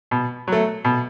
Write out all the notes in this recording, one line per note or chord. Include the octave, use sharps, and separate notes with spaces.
B2
F#3 A3
B2